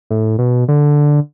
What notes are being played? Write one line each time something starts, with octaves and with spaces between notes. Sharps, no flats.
A2
B2
D3